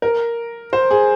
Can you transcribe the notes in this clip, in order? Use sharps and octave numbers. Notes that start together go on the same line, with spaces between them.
A#4
C5
G#4